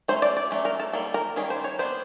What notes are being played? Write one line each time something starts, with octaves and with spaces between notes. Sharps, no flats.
F#3 A3 C#4 C5
D5
D5
F#3 A3 C#4
A#4
A4
D#3 G3 A#3 A4
A#4
D#3 G3 A#3 C#4 G#4
C5
C#5
G3 B3 D4 C5